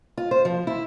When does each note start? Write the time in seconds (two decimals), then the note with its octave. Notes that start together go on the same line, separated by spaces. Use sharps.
0.18 F4
0.31 C5
0.45 F3
0.67 E4